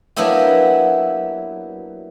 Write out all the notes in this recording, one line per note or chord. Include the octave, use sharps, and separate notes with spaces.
F#3 A#3 B3 D4 E4 G4